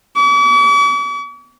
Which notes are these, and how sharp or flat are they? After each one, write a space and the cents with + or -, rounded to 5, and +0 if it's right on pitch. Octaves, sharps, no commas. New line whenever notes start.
D6 -45